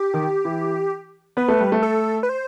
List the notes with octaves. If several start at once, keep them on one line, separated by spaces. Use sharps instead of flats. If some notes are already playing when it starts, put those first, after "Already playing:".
Already playing: G4
D#3
E3
B3 B4
A3
G3
A3
A4
B4
C5